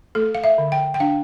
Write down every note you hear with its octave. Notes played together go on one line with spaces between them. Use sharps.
A3 A4
F5
E5
D3
G5
G5
D4 F5